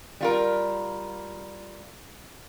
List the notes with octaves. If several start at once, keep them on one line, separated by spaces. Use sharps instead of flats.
G3 F4 A#4